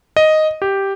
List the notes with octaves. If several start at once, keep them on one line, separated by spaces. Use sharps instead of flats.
D#5
G4